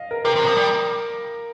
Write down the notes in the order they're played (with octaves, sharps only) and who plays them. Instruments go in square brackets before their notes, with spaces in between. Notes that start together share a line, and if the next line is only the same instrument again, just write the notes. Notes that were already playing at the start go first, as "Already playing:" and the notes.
Already playing: [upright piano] D#5 F5
A#4
[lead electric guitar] C3 [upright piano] A#4
[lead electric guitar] C3
F3
G3